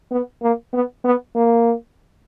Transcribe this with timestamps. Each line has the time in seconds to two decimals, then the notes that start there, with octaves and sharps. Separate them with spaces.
0.11 B3
0.42 A#3
0.73 B3
1.04 B3
1.35 A#3